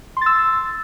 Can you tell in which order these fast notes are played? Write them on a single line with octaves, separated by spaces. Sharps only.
C6 A6 E6